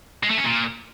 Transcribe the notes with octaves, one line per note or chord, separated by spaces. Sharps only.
G#3
A3
C#4
A#2